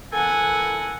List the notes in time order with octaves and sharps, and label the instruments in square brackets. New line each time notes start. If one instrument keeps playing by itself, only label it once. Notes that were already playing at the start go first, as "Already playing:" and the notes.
[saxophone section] E3 A4 A#4 [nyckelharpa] F#5 G#5